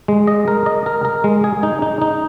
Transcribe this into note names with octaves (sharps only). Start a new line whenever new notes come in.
G#3
D#5
A#4
D#5
A#4
A#4
G#3
G#4
D#4
D#4
D#4